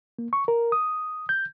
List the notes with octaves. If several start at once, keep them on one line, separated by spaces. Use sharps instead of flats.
A#3
C#6
A#4
D#6
G6